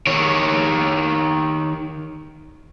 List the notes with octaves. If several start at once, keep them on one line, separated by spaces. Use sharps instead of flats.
D#3 C#5